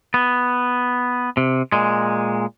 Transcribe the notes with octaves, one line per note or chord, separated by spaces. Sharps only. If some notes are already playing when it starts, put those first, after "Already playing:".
B3
C3
A#2 G#3